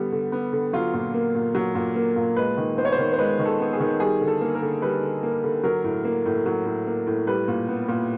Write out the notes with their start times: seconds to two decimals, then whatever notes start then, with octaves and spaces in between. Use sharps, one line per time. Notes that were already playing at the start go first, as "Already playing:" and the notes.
Already playing: D3 G3 B3
0.12 D3
0.32 B3
0.53 D3
0.73 F#3 F4
0.94 A#2
1.14 A#3
1.35 A#2
1.55 F#3
1.75 A#2
1.96 A#3
2.16 A#2
2.36 G#3 B4
2.57 D#3
2.78 B3 C5
2.85 C#5
2.92 C5
2.98 D#3
3.13 C5
3.18 G#3 B4
3.39 D#3
3.45 A4
3.60 B3
3.73 G#4
3.80 D#3
4.00 G3 G#4
4.21 D3
4.28 A4
4.41 A#3
4.55 A#4
4.62 D3
4.82 G3 B4
5.03 D3
5.23 A#3
5.44 D3
5.64 F#3 A#4
5.84 A2
6.05 A#3
6.26 A2
6.46 F#3
6.66 A2
6.87 A#3
7.07 A2
7.27 G3 B4
7.48 A#2
7.69 B3
7.88 A#2